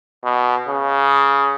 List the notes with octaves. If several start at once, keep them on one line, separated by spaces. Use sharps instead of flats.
B2
C#3